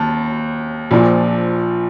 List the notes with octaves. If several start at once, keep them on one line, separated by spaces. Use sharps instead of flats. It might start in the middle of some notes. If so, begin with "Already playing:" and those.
Already playing: D#2 A5
A#1 A#2 F3